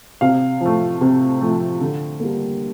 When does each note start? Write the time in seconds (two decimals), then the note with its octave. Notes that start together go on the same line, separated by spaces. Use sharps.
0.21 C3 F5
0.61 F3 A3
1.01 C3
1.41 F3 A3
1.81 D3
2.20 G3 A#3